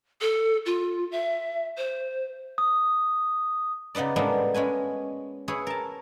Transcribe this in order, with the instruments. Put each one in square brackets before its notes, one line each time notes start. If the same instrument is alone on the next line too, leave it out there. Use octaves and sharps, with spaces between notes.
[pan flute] A4
F4
E5
C5
[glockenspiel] D#6
[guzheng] C#3 B3 D#4 B4 D5
A2 G3 G#3 A#3 B3 D4
G#3 C#4 B4 G#5
E4 G#4 B4 C#5
A#4 A5